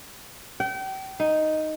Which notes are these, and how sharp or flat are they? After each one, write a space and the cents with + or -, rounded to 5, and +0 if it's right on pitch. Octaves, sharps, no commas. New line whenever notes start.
G5 -35
D#4 +0